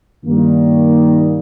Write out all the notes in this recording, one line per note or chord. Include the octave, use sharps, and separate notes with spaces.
G2 D#3 G3 A#3